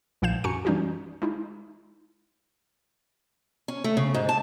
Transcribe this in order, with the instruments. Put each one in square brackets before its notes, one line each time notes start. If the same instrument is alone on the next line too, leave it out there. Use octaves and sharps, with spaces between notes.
[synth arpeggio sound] B1 A#2 F3 F5 G6 E7
F#2 F#4 G#5 A#5 C#6 C#7
E3 G3 C#4 D#4 F4 F#4
G#3 D#4 E4
[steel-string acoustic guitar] C#4
A3
C#3
G#2
A5